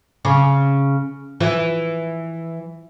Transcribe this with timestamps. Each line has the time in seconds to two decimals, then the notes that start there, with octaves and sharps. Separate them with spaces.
0.25 C#3
1.40 E3